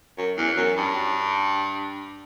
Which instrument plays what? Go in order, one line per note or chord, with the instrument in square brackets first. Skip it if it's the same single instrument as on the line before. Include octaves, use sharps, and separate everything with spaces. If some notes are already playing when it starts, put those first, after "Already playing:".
[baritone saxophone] F#2
E2
F#2
G2